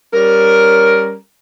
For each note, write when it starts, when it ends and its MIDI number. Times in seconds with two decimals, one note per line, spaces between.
0.14 1.14 55
0.14 1.14 61
0.14 1.14 70